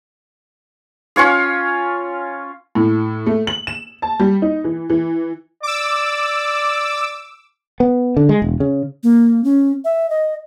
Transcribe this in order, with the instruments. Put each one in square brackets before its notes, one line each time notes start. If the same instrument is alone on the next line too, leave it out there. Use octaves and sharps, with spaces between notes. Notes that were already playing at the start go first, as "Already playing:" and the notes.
[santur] C#4 F4 C#5 F5
[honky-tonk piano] A2
A3
F#7
E7
A5
G3
D#4
E3
E3
[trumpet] D5 [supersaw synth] D6 E6
[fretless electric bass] B3
D3
G#3
E1
C#3
[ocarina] A#3
C#4
E5
D#5